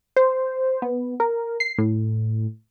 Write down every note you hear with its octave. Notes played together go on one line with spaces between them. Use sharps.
C5
B3
A#4
C7
A2